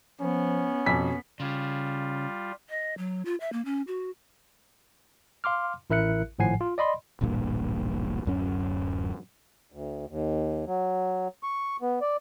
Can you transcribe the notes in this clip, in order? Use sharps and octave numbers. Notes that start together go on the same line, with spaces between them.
F3 B3 C#4
F2 B2 G#5 B6
C#3 G3 F4
D#5
F#3
F4
E5
A#3
C#4
F#4
F5 C6 D6 F6
A1 E4 A#4 E5 F#6 C#7
G#1 A2 F3 F#5 G#5 C7
F4
D5 D#5 B5 C6
D1 A1 G2 A#2
D1 F#2 C#4
D2
D#2
F#3
C#6
B3
D5